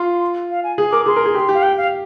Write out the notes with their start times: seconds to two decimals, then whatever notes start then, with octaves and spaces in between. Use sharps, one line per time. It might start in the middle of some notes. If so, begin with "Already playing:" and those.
Already playing: F4 C6
0.50 F5
0.64 G#5
0.78 G#4
0.92 A#4 D6
1.06 G#4 C6
1.16 A#4
1.26 G#4
1.35 G4
1.49 G4
1.54 F5
1.63 G5
1.78 F5